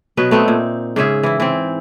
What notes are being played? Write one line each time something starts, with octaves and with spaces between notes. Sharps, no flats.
B2 F#3 B3 B4
A3 B3 C4 D#4
A#2
G#2 C#3 G#4 E5
E3 E4
E3 C4